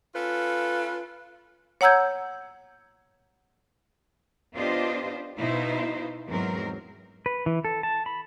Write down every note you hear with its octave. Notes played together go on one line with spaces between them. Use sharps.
C#4 F4 A4 B4
C#5 F#5 A#5 E6 G6 G#6
B3 D4 F4 G4 C5 D#5
B2 B3 D#4 E4 C5 F5
E2 G#2 F#3 C4 A#4
B4
E3
A4
A5
B5